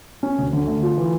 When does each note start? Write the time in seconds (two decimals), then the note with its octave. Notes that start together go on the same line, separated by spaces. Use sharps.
0.23 C#4
0.38 D2
0.53 D3
0.67 A3
0.83 F4
0.98 E3